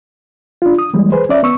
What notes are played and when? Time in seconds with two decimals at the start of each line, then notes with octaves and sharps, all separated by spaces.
0.62 D4 F4
0.79 D#6
0.94 E3 G3 G#3 A#3
1.12 G#4 B4 C5
1.29 C#4 D5 E5
1.43 B3 C#6 E6